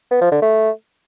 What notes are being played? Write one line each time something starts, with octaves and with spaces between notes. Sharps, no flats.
B3
F3
D3
A3